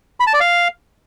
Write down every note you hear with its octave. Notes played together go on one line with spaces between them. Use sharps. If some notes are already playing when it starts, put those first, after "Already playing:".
B5
A5
D5
F5